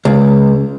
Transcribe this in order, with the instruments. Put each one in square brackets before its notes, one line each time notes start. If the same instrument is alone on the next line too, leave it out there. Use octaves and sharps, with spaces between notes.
[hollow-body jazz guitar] C#2